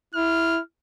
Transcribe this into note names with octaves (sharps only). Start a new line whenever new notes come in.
E4 F6